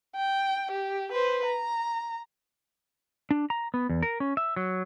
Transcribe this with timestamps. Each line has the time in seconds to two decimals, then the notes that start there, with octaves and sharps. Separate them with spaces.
0.15 G5
0.71 G4
1.12 B4 C5
1.45 A#5
3.31 D4
3.50 A#5
3.74 B3
3.89 E2
4.03 A#4
4.20 C#4
4.37 E5
4.56 F#3